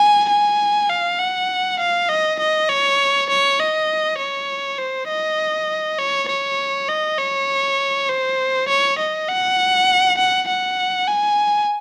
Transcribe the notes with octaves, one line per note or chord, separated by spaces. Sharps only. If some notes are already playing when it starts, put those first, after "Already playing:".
Already playing: G#5
G#5
F5
F#5
F5
D#5
D#5
C#5
C#5
D#5
C#5
C5
D#5
C#5
C#5
D#5
C#5
C5
C#5
D#5
F#5
F#5
F#5
G#5